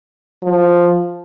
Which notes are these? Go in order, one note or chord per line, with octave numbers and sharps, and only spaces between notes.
F3